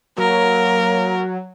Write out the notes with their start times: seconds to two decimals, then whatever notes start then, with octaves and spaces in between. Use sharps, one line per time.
0.18 F#3 A#3 A#4